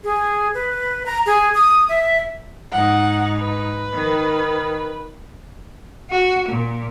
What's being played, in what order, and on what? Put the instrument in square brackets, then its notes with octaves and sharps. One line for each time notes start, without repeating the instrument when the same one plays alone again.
[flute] G#4
B4
A#5
G#4
D#6
E5
[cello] G#2 D#4 [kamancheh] F#5
[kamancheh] B4
[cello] D#3
[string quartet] F#4
A#2